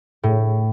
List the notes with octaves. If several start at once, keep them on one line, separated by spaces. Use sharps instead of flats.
A2